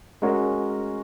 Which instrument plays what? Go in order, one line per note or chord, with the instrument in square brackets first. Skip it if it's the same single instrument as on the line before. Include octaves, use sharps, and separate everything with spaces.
[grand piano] G#3 C#4 F#4 A#4 C#5